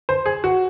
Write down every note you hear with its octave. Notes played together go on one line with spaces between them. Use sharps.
C5
G#4
F#4